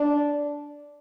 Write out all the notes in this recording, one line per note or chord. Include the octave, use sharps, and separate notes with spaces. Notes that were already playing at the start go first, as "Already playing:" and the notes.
Already playing: D4